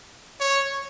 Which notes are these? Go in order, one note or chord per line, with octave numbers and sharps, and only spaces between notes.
C#5